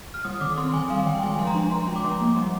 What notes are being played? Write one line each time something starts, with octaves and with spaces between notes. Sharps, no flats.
F6
G3 D#6
D#3 D6
C4 C6
D#3 G#5
G3 F5
D#3 G5
G#3 G#5
F3 C6
A#5
D4
F3 C6
G#3
D6
F3
A#3
G3